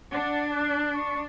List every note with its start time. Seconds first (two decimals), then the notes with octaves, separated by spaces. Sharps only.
0.13 D4 F#5
0.53 F#6
0.94 C#6